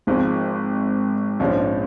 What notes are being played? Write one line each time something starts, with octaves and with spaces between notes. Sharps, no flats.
G#1 G#2 F3 G#3
A#1 G#2 F3 G#3 C#4